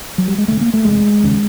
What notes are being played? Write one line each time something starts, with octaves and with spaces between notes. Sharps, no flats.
F#3
G3
G#3
E1 D2 D3 A3
A#3
A3
F#1 E2 C3 G#3
F1 D#2 C#3